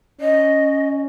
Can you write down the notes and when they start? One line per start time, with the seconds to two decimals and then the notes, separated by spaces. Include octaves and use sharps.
0.21 C#4 D#5